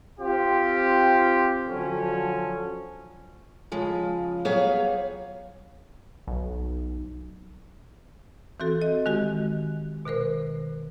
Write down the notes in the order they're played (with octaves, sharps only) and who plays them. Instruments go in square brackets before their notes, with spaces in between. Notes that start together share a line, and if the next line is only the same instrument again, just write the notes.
[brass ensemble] C4 F4 G4
D3 F3 F#3 C#4
[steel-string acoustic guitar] C#3 F3 G#3
F#3 G3 B3 G#4 C#5 F5
[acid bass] B1
[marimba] E3 C4 F#4 A4
D#5
D#3 G#3 F#4 G4
B2 D#3 A#4 C5